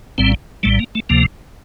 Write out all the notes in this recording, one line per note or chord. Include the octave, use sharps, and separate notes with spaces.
A#1 A2 G3 C4
A#1 A2 G3 A3
A#3
A3
D2 C3 F3 A#3